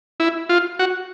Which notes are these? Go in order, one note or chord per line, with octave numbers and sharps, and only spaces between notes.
E4
F4
F#4